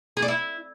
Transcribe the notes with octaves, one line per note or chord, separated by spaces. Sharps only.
G#4
D5
E4